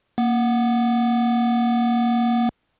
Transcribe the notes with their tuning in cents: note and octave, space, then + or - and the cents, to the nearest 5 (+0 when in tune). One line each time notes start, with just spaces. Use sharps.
A#3 +0 F#5 +0